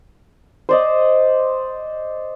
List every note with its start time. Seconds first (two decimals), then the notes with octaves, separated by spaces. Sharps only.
0.69 C5 D5 D#5